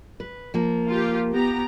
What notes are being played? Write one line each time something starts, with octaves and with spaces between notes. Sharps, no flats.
B4
F3 A#3
F4 G4
B3 G4 A#5